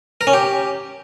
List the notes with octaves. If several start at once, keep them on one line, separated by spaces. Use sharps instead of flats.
A#4
C#4
G4